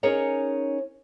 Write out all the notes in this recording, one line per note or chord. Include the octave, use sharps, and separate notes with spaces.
C#4 D#4 G#4 A#4 C#5 D#5